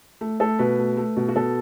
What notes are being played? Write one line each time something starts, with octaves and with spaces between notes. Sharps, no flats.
A3
A3 A4
B2 B4
A3
A3
B2
F#4
B2 A4